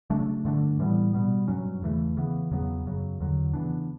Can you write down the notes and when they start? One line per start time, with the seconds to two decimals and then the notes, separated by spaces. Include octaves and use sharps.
0.10 C#3 F#3 A3 D4
0.45 G2 D3 A3 D4
0.79 A2 E3 G3 B3
1.13 B2 G3 B3
1.48 G2 F#3 C#4
1.82 E2 C#3 E3 A3
2.17 C#3 E3 B3
2.51 E2 C#3 F#3 B3
2.85 F#2 C#3 F#3
3.20 E2 D3 F#3
3.53 C#3 E3 B3 D4